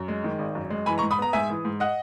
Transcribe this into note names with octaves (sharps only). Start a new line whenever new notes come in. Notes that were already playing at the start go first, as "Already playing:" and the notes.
Already playing: F#2
G#3
D#3
G#1
F#2
G#3
E3 G#5 B5
A#5 C#6
G#2
B5 D#6
B3 A#5
G#2 E5 G#5
E3
G#2
D#5 F#5